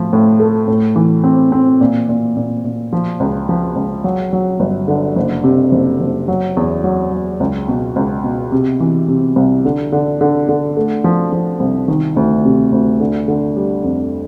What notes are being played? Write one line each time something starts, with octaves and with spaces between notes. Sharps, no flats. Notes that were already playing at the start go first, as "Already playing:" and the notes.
Already playing: A2 F3
A2
A3
A2
E3
C4
C4
A#2
A#2
A#2
A#2
F3
C#2
F3
C#2
F#3
F#3
G1
D3
F#1
C3
F#1
F#1
F#3
E2
F#3
F#3
C#2
B2
C#2
B2
C3
E3
C3
C2
D3
D3
D3
D3
A3
F3
F3
C2
D#3
D2
C3
D2
D3
D3
G3
F2